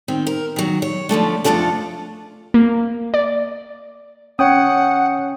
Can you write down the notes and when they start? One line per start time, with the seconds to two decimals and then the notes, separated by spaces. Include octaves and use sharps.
0.08 D#3 C4
0.27 A#4
0.56 D#3 F#3
0.82 C#5
1.09 D3 F3 A3 D4
1.44 F2 G3 A3 D4 F4 A4
2.54 A#3
3.14 D5
4.39 C#4 C#5 F#5 G5 D#6